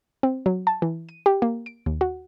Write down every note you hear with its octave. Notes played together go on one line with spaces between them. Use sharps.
C4
F#3
A5
E3
D#7
G4
A#3
D7
D#2
F#4